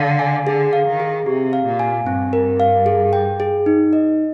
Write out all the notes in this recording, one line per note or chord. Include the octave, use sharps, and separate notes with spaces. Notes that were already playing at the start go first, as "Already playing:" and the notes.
Already playing: D3 F5
G#5
D3 G#4
F5
D#3
G#4
C3 G4
F5
A#2
G#5
G2 C4
A#4
F5
G#4
G5
G#4
D#4
D#5